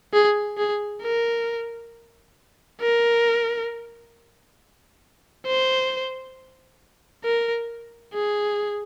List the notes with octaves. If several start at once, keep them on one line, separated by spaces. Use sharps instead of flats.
G#4
G#4
A#4
A#4
C5
A#4
G#4